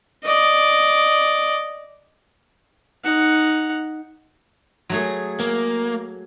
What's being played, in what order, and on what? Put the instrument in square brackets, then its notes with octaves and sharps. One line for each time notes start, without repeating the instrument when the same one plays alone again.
[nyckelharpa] D5 D#5
D#4 F#5
[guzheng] F#3 A3 G#4
[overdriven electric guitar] A#3